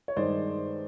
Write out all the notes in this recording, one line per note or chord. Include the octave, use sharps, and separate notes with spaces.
C#5
G2 D#3 G#3 C5 D5